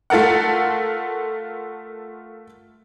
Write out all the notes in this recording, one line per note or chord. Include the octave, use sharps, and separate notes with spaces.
A3 F4 A4 A#4 F#5